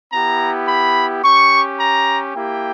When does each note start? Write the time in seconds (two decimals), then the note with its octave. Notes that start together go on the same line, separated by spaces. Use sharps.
0.12 B3 E4 G4 A#5
0.67 B5
1.23 C#4 G4 C#6
1.79 A#5
2.34 A#3 E4 G4 G5